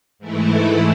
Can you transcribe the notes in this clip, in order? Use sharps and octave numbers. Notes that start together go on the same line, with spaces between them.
G#2 E3 A3 E4